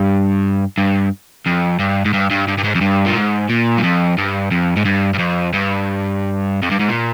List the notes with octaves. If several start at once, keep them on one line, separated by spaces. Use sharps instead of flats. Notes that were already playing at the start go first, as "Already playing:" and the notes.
Already playing: G2
G2
F2
G2
G#2
G2
G2
G2
G2
G#2
F2
G2
A#2
G#2
A#2
G2
F2
G2
F2
G#2
G2
G2
F2
G2
F2
G2
G#2
A#2